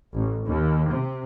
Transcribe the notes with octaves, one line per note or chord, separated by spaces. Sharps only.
A1
D#2
C3